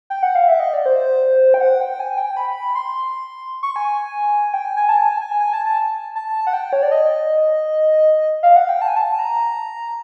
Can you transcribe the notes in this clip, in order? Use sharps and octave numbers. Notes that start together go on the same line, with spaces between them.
G5
F#5
F5
E5
D#5
D5
C5
G5
F#5
G5
G#5
G5
B5
C6
C#6
G#5
G5
G#5
G#5
A5
G#5
G#5
G#5
A5
A5
A5
A5
F#5
G5
C#5
D5
D#5
F5
F#5
G5
A5
G#5
A5
A#5